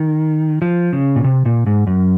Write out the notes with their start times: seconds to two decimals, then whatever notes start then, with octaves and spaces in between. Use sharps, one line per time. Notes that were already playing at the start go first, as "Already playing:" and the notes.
Already playing: D#3
0.62 F3
0.93 C#3
1.16 A#2
1.24 C3
1.46 A#2
1.67 G#2
1.87 F#2